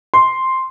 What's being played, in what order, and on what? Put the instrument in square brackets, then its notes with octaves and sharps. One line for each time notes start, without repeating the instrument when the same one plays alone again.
[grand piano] C6